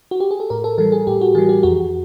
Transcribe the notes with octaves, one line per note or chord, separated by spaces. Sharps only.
F#4
G4
G#4
A4
A2 A#4
A4
E3 G3 A4
G#4
A2 G4
F#4
E3 G3 G#4
G4
F2 F#4